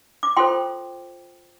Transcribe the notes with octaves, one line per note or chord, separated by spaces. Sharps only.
D6
F4 A4 C5 G5 C6